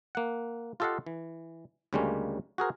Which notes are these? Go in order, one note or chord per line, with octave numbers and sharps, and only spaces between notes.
A#3 F#5
F4 G4 A4 D#5 F5 F#5
E3
D2 C#3 G3 G#3 A#3 C#4
F#4 G#4 A#4 C5